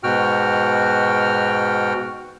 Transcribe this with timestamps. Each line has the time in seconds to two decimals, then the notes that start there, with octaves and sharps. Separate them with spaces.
0.03 G#2 B2 F#4 G5 F6